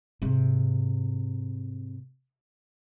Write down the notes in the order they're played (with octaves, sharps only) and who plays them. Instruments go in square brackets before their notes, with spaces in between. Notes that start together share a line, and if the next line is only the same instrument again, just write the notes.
[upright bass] G#2 C3